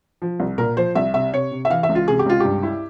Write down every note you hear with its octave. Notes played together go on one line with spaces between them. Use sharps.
F3
C2
A#2 A#4
F3 C5
C2 E5
C3 E5
C3 C#5
C3
E5
E3 F5
E5
C#2
F4
C3 G#4
G4
C#2 F4
G2 G4
E4